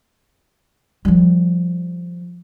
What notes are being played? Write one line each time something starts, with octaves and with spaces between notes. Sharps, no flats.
F3 G3